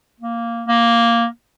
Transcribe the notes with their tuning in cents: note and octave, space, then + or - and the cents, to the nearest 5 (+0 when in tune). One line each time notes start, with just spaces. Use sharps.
A#3 -5
A#3 +0